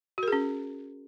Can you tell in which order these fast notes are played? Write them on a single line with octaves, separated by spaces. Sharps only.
F#4 A#4 G#4 C#4